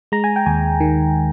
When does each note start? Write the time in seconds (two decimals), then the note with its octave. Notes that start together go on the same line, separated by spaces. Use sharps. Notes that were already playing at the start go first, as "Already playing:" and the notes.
0.12 G#3 A#5
0.24 G#5
0.36 G5
0.46 D#2 G#5
0.80 D#3